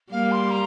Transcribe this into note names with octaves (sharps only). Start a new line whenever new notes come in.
G3 A#3 F5
C6
A#5